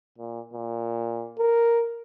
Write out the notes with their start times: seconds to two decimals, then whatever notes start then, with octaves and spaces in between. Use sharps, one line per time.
0.18 A#2
0.53 A#2
1.39 A#4